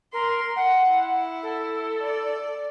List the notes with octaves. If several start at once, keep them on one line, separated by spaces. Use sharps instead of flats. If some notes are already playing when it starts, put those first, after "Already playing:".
A#4 C6
F#5
E4
A4
D5